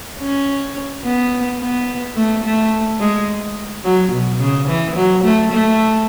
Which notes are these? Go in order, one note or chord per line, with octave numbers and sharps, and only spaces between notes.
C#4
B3
B3
A3
A3
G#3
F#3
B2
C#3
E3
F#3
A3
A3